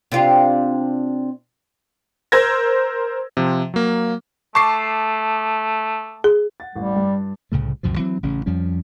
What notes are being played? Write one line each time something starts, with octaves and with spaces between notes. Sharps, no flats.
C3 D4 F4
A#4 C5 E6 G6 G#6 A#6
C3 F3
F#3 A#3
A3 A5 C#6 D6 C7
G#4
F#5 A6
A1 G3
G2
C2 A2 C#3 A3
C#2 F#2 B2 F3
E3 F#3 C4
A1 C#3 C#4
F2 F3 G3 C#4